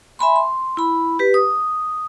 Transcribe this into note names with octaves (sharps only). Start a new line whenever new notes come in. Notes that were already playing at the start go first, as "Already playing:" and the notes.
E5 G#5 B5 C6
C6
E4 B5
G4 B4
D#6